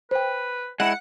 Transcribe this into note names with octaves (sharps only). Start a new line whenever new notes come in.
B4 C5 G5
G#3 E4 F#5